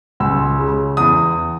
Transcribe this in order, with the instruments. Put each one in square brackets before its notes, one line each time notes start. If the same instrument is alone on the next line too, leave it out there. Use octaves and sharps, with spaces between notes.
[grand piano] C#2 E6
C#3
E2 D#6